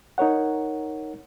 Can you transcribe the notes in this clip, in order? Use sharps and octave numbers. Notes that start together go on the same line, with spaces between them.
D#4 A#4 C#5 F#5